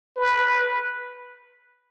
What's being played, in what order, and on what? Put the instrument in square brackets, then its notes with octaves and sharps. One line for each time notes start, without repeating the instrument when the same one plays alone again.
[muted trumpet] B4